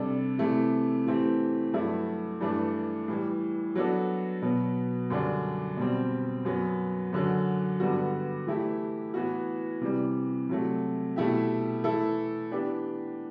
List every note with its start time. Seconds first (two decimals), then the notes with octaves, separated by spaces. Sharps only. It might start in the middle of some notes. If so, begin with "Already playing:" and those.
Already playing: C3 G3 D4 A4
0.39 C3 E3 A3 E4
1.06 A2 E3 A3 C4 G4
1.74 G2 F#3 A3 E4
2.41 G2 E3 A3 D4
3.08 A2 E3 G3
3.75 F#3 B3 D4 F#4 A4
4.42 B2 F#3 B3
5.10 F#2 D3 G3 D4
5.77 B2 G3 C4
6.45 F#2 F#3 B3
7.13 F#2 D3 F#3
7.80 G2 D3 G3 B3 F#4
8.47 E3 A3 E4 G4
9.14 A2 E3 B3 F#4
9.81 C3 E3 G3
10.49 C3 F#3 A3
11.16 B2 A3 E4 G4
11.84 E3 A3 E4 A4
12.51 E3 B3 D4 G4